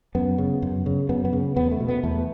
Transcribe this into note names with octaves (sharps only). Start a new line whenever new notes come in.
F#2 B3
C#3
F#2
C#3
F#2 B3
B3
C#3
E2 B3
A3
B2
B3
E2 A3